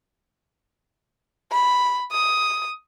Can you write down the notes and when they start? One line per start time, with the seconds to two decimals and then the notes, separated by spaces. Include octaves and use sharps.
1.52 B5
2.12 D#6